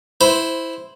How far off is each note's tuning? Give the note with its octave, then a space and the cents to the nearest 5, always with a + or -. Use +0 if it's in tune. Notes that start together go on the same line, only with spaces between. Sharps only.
E4 +0 C5 +0